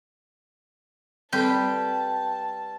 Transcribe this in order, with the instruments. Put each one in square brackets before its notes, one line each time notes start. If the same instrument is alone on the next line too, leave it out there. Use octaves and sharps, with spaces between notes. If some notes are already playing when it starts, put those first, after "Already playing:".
[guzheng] G3 B4 C6 [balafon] C4 A4 [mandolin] G5 [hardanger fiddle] A5